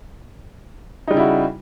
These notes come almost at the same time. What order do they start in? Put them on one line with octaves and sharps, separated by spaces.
D#4 G3 C#3 E4 F#4